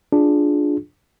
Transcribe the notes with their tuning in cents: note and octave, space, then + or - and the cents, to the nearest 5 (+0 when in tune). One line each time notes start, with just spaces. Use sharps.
D4 +0 F4 +0 G#4 +5